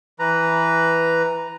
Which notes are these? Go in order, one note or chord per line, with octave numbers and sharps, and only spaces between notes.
E3 B4 A#5